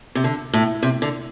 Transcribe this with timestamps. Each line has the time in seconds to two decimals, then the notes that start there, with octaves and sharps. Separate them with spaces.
0.15 C3
0.24 D3
0.53 A2
0.83 C3
1.02 D3